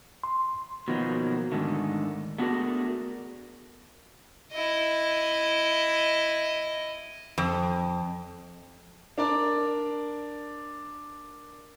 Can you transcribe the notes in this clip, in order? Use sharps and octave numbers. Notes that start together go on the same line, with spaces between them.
C6
B2 D#3 F3 F#3 A#3
G#2 D3 D#3 A3
A3 B3 D4 F#4 G#4 A#4
E4 D#5
F2
D4 A#4 D5